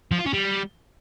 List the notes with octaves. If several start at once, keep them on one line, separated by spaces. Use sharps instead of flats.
F3
F4
C#4
G3